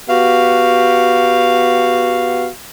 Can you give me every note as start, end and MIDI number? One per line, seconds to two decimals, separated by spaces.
0.08 2.46 59
0.08 2.46 66
0.08 2.46 67
0.08 2.46 77